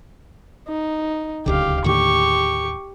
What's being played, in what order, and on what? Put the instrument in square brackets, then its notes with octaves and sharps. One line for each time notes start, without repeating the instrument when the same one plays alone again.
[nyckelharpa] D#4
[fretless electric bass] D1 C#2 D3 [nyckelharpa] G4 F5
[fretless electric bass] D#2 A2 D3 [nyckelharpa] G4 C#6